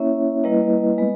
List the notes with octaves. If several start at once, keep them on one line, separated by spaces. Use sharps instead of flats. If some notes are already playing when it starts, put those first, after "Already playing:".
Already playing: A#3 C#4 E4 C#5 E5
G3 A#3 E4 B4 D#5
G#3 B3